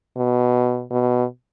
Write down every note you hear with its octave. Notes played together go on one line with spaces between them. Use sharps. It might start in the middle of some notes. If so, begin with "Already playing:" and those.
B2
B2